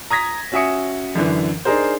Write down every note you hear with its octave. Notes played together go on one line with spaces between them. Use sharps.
A#5 D#6 G#6 A#6 B6
C#4 F#4 E5 G#5 D#6 C#7
F#2 D3 E3
D4 D#4 G#4 A#4 C5